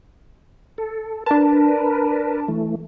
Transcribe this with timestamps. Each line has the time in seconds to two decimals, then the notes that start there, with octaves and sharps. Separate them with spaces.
0.78 A4
1.26 D4 A#4 B4 A5
2.48 E3 A3